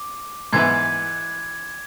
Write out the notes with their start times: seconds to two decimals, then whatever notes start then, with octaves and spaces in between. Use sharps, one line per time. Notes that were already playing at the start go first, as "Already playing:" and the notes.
Already playing: D6
0.53 G#2 E3 B3 E4 G#6